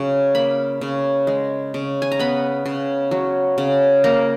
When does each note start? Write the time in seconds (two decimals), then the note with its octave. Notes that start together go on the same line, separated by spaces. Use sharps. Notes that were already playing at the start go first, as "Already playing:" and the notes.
Already playing: C#3 F#3
0.35 A#3 B5
0.81 C#3
1.27 G#3
1.74 C#3
2.02 G#5
2.12 A#5
2.19 B3 B5
2.66 C#3
3.11 F#3
3.58 C#3
4.04 A#3 A#5